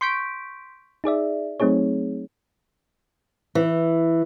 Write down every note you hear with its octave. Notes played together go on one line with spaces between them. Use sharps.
C6 C#6 G6 B6 D7
D#4 G#4 D5 E5
F#3 A3 C4 D#4 G#4 C#5
E3